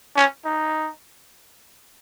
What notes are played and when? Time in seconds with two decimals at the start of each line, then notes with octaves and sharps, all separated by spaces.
0.16 C#4
0.45 D#4